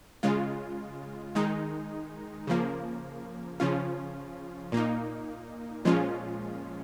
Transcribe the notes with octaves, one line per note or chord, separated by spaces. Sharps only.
C#3 G#3 F4
D#3 G#3 D#4
C#3 F3 A#3
C#3 F3 C#4 F4
A#2 A#3 D#4
A#2 F3 G#3 C#4 F4